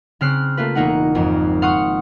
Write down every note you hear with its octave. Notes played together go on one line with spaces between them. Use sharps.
C#3 C4 F6 F#6 C7
A3 A#3 F4 B4
E1 A#3 D#4 F#5
G#1 F2
F5 F#5 C6 C#6 D#6